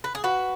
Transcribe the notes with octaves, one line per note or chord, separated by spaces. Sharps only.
B4
G#4
F#4 B4